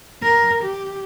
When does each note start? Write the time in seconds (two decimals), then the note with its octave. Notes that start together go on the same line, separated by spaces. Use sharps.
0.22 A#4
0.63 G4